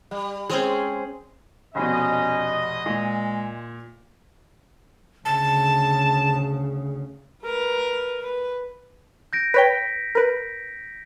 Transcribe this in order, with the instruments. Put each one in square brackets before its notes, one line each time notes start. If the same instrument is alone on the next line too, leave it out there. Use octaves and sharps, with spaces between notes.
[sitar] G3
[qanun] G#3 C4 C#4 [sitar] G#4 C5
[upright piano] F1 F2 B2 [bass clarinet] C#4 [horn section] D#5
[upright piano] A#2 [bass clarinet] G#3
[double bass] D2 C#3 [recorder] A5
[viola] A#4 B4
B4
[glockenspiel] G6 A#6 D7
[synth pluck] B4 C#5 G5 [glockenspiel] B6
[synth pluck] A#4 B4